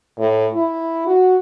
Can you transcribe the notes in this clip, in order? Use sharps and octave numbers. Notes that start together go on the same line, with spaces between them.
A2
E4
F#4